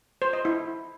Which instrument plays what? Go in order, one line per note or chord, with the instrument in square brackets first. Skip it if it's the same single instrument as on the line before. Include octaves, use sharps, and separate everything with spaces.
[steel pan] C5
D#5
E4